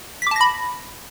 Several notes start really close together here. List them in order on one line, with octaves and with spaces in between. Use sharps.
B6 D6 A5 A#6 B5